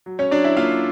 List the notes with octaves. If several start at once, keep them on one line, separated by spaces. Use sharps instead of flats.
F#3
C#4 C#5
F#3 D4 D5
E4 E5
A#3 F4 F5